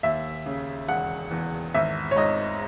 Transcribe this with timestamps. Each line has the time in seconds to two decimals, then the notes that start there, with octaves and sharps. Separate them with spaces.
0.03 D#2 E5
0.46 C#3
0.88 E1 F#5
1.31 E2
1.74 G#1 E5
2.11 C#5
2.16 G#2 D#5